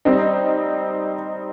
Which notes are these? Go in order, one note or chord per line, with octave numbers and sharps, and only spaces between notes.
G3 C4 D#4